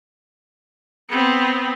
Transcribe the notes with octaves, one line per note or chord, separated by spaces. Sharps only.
B3 C4